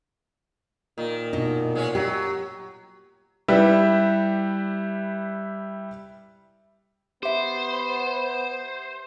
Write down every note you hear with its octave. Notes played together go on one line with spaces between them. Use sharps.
A#2 D#3
B2 D#4
G#3 C#4
F#3 G4
G3 E4 G4 B4 E5
B3 G4 C5 E5